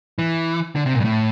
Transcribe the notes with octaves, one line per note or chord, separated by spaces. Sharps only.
E3
D3
C3
A#2
G2
A2